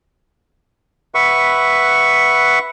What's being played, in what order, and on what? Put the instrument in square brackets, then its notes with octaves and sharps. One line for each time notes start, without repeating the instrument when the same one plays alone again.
[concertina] B4 E5 F#5 C#6